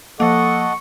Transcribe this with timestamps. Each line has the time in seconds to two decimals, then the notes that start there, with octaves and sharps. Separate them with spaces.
0.20 F3 A#3 A4 D#5 F#5 C#6